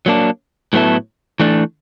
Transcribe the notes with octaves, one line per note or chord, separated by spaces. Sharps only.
F#3 A#3 D4
A2 F#3 B3 E4 A4
E3 A3 D4